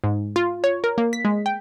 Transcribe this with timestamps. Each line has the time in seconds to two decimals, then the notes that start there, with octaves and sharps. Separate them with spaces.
0.04 G#2
0.36 F4
0.64 C#5
0.84 A#4
0.98 A#3
1.13 B6
1.25 G#3
1.46 G5